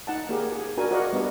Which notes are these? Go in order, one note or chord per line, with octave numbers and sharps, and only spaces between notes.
D#4 F#5 A5
A#3 G4 G#4 A#4
G#4
D4 F#4 A#4 G#5
F#4 A#4 D5 D#5 F5 F#5
G3 B3 D4 D#5